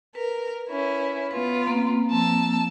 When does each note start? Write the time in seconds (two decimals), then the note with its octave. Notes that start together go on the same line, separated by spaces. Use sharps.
0.15 A#4 B4
0.69 C#4 E4
1.31 B3 F4 B4
1.67 A#3 C4
2.10 F3 A5 E6